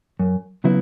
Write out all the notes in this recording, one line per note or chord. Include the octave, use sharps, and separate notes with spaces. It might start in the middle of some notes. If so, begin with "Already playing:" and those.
F#2
C#3 F#3 B3 E4